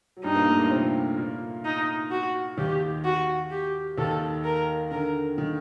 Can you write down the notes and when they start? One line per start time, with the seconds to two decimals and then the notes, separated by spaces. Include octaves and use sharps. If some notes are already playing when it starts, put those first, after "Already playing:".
0.17 F#3
0.23 G2 G3 D#4
0.35 A#2 A#3
0.47 A2 A3
0.59 A#2 A#3
0.71 C3 C4
1.17 A#2 A#3
1.65 D#4
2.11 F#4
2.57 D#2 D#3 G4
3.04 F#4
3.51 G4
3.98 D#2 D#3 A4
4.44 A#4
4.91 D3 A#4
5.38 D#3